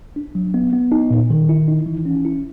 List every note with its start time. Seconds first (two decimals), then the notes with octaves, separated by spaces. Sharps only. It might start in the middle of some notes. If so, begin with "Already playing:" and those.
0.16 D4
0.35 F#3
0.54 B3
0.73 B3
0.92 D#4
1.10 A#2
1.30 D#3
1.49 E4
1.68 D#4
1.86 E3
2.06 C#4
2.25 E4